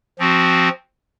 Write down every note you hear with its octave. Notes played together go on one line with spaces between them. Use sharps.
F3 C4 F#4